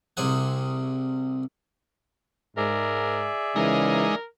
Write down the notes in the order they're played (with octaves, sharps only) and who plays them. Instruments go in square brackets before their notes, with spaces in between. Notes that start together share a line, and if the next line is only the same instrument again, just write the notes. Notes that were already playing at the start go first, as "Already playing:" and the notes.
[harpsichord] C2 C3 G#4 F#5
[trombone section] G#2 [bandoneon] G#4 D5 E5 [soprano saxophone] A#4
[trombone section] C#3 E3 [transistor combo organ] G#3 D#4 [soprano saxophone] A#4